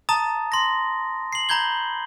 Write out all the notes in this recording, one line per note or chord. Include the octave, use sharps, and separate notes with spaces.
A5 A#5 D#6 A6
C6 A#6
C7 F#7
A#5 B5 G6 G#6 G7